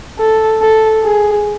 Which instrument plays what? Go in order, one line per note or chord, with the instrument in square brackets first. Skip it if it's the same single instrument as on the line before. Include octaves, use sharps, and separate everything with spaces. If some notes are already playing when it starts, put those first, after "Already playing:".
[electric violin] A4
A4
G#4